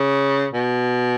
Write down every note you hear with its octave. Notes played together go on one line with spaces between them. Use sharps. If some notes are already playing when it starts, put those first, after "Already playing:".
Already playing: C#3
B2